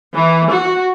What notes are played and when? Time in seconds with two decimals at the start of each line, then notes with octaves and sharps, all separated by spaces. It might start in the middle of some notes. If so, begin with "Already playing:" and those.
0.14 E3
0.49 F#4